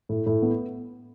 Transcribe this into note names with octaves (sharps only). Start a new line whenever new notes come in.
A2
A2
B3